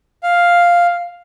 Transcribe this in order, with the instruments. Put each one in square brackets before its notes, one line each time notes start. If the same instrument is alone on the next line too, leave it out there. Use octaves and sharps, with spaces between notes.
[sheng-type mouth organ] F5